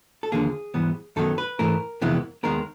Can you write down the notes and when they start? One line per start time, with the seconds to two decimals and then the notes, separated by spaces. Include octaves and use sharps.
0.23 A4
0.32 D#2 D3 F3 A#3 G#4
0.74 G#2 E3 G3 B3
1.16 F#2 D#3 F#3 B3 A4
1.38 B4
1.59 G#2 E3 A3 A#4
2.02 F2 C3 E3 G#3 B3
2.43 D#2 D#3 G#3 B3 A#4